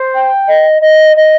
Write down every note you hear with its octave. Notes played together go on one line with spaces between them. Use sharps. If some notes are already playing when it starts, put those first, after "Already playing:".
Already playing: C5
G5
D#5
D#5
D#5